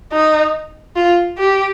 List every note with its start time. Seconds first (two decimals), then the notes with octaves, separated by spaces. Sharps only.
0.13 D#4
0.96 F4
1.38 G4